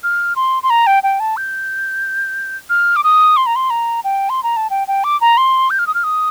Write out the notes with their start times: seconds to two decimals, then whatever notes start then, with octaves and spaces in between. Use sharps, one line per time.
0.03 F6
0.36 C6
0.63 C6
0.70 A#5
0.87 G5
1.03 G5
1.20 A5
1.37 G6
2.70 F6
2.96 D6
3.04 D#6
3.37 C6
3.46 A#5
3.56 C6
3.70 A#5
4.04 G5
4.30 C6
4.43 A#5
4.57 A5
4.70 G5
4.88 G5
5.04 D6
5.21 A#5
5.37 C6
5.70 G6
5.79 F6
5.87 D#6
5.94 F6
6.04 D#6